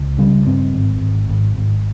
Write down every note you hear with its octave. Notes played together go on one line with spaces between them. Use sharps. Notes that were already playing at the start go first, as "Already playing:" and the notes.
Already playing: C#2
C#3 G3
G2 C4
G#1
G#1
G#1
G#1